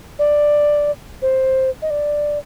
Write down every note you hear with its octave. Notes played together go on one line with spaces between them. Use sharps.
D5
C5
D#5
D5